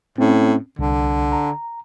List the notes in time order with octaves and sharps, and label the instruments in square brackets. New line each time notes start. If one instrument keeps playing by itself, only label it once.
[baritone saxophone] A2 [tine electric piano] C4 C#4
[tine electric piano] C2 [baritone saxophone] D3
[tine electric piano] A#5